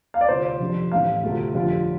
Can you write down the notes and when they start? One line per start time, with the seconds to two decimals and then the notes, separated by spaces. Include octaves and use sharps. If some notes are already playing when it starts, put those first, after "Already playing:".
0.14 F5
0.21 D5
0.28 D2 C3 G3 F4 C5
0.60 F1 F2 D3 G3 D4
0.92 A1 A2 G3 C4 F5
1.23 D2 C3 A3 C4 F4
1.54 G1 F2 D3 G3 F4